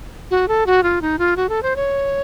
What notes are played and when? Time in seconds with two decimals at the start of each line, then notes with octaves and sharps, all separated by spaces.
0.31 F#4
0.48 A4
0.66 F#4
0.83 F4
1.02 D#4
1.19 F4
1.37 F#4
1.49 A4
1.63 C5
1.76 C#5